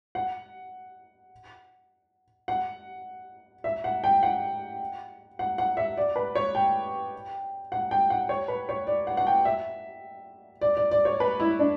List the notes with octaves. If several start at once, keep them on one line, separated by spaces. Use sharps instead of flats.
F#5
F#5
E5
F#5
G5
F#5
F#5
F#5
E5
D5
B4
C#5
G5
F#5
G5
F#5
C#5
B4
C#5
D5
F#5
F#5
G5
E5
D5
D5
D5
C#5
B4
E4
D4